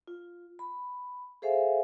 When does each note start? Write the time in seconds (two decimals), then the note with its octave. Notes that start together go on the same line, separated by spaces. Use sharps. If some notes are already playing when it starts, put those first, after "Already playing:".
0.07 F4
0.59 B5
1.42 G#4 A4 C5 E5 F5 G#5